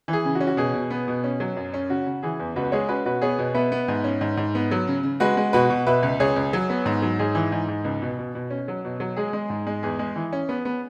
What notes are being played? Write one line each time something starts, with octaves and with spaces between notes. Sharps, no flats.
E3
G#4
C#3
F#4
C#4
F#4
B2 G#4
B2
B3
B2
C#4
F#3
F#2
C#4
C#3 F#4
C#3
E3 G#4
E2
C#2 F#4 B4
G#3 G#4 C#5
C#4 F#4 B4
B2 F#4 B4
B3 G#4 C#5
B2
B3 B4 E5
B3
G#2
C#4
G#2
G#2
B3
F#3
C#3
C#3
G#3 F#4 B4
G#3
B2 F#4 B4
B2
B2 B4 E5
C#2
C#2 G#4 C#5
C#2
F#3
B3
G#2
F#3
G#2 G#4
E3
G#2
G#2
C#2
B2
B2
B2
C#4
F#3
B2
F#3
G#3 G#4
G#3
G#2
G#3
E2 G#4
G#3
E3
C#4
B3
B3